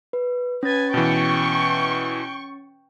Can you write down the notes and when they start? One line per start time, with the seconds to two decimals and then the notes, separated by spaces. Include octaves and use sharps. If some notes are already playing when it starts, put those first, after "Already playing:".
0.13 B4
0.63 C#4 B4 G#5 A6
0.94 B2 E3 G5 C#6